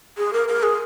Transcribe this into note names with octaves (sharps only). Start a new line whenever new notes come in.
G#4
A#4
A#4
G#4